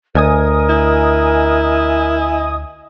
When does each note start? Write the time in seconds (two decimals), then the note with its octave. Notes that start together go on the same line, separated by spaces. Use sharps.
0.15 D2 A#4 D#5 G#5 D#6
0.69 E4